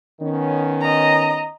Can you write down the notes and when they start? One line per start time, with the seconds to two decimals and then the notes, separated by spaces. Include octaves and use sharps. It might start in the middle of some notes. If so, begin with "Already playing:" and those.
0.21 D#3 B3 C#4
0.81 D#5 A#5